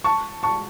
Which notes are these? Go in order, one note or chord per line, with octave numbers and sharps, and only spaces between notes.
A5 C#6
A5 C#6